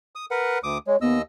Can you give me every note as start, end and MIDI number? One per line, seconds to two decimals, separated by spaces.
0.15 0.26 87
0.31 0.59 70
0.31 0.59 71
0.31 0.59 78
0.63 0.78 38
0.63 0.78 86
0.63 0.78 87
0.87 0.96 56
0.87 0.97 73
1.01 1.22 39
1.01 1.17 59
1.01 1.22 75
1.01 1.22 88